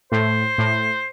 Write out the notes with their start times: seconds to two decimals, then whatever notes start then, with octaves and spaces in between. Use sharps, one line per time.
0.12 A2 C5
0.58 A2